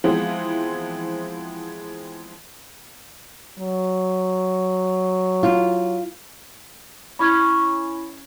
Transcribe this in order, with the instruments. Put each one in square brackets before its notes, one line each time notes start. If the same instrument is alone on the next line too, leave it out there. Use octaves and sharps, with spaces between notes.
[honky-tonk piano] E3 F3 G#3 B3 C4
[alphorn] F#3
[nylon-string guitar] F4
[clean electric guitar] C#4 C#5 [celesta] E4 B5